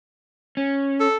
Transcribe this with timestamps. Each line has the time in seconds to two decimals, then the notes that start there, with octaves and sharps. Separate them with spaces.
0.57 C#4
1.00 A4